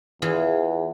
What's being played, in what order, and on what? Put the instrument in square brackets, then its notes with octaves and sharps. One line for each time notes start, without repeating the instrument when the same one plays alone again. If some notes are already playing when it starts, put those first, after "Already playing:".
[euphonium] E2 [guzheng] E3 F4 G#4